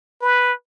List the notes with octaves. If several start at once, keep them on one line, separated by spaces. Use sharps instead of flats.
B4